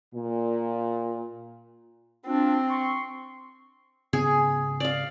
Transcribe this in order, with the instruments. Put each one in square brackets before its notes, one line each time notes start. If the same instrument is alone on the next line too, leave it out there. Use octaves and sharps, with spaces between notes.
[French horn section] A#2
[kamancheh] C4 [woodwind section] D4 F4
[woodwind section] C6 C#6
[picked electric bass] G#2 C#3 B3 [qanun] G#4
[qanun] D5 F5